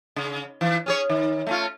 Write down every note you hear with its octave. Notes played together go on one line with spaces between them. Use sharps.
C#3
E3
C#4 G#4 C#5
D#3
A3 C#4 F4